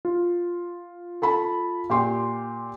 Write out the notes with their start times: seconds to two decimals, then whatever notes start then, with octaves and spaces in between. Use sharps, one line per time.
0.05 F4
1.22 A4 A5 B5
1.90 A#2 G4 C6